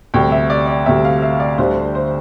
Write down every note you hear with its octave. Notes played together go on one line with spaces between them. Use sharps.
D2 C3 G3 G5
E5
D5
D5
D2 C3 G3 E5
F5
E5
D5
D2 D3 G3 C5
C5